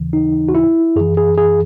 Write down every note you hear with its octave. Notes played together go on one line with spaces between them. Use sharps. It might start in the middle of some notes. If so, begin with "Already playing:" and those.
Already playing: D#2 C#3 E3
D#4
F#4
E4
F#2 E3 G#4
G#4
G#4